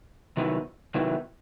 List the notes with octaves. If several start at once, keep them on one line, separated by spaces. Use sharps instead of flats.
C3 D#3 F#3 B3 E4
C3 D#3 F#3 B3 E4